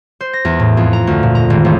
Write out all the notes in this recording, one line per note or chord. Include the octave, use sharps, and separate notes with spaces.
C5
A#6
E2
A2
F2
A#5
D2
A#2
A#5
G#1
A1